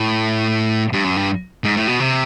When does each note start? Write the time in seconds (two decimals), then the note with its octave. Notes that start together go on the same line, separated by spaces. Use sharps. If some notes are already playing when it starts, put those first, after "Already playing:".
Already playing: A2
0.93 G2
1.04 F#2
1.16 G2
1.64 G#2
1.77 A2
1.88 B2
2.00 C3